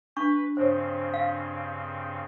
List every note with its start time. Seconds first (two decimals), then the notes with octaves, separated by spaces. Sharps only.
0.17 D4 B4 C#6
0.57 G2 C#3 C4 C5 C#5
1.14 F5